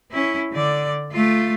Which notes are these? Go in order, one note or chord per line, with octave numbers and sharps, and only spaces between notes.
C#4 E4
D3 D5
A3 F4